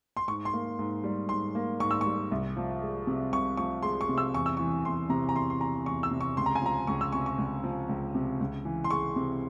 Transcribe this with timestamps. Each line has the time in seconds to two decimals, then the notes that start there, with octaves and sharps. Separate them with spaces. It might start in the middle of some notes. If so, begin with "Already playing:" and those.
0.17 C6
0.28 G#2 C#6
0.45 C6
0.54 A#3
0.79 G#2
1.04 G3
1.29 G#2 C6
1.55 A#3
1.80 G#2 C#6
1.91 E6
2.01 C#6
2.06 G3
2.31 C2
2.57 F3
2.82 G#3
3.07 C3
3.32 C2 C#6
3.57 F3 C#6
3.83 G#3 C6
4.01 C#6
4.09 C3
4.18 E6
4.34 E2 C#6
4.46 E6
4.57 E3 C#6
4.85 E2 C6
5.09 C3 A#5
5.29 A#5
5.35 E2 C6
5.50 C6
5.61 E3 A#5
5.86 E2 C#6
6.03 E6
6.11 C3
6.21 C#6
6.37 C#2 C6
6.46 A#5
6.55 G#5
6.62 F3 A#5
6.87 C#2 C#6
7.01 E6
7.12 C3 C#6
7.26 C#6
7.38 C#2
7.64 F3
7.89 C#2
8.15 C3
8.41 C#2
8.65 E3
8.84 C6
8.90 G#3 C#6
9.16 C3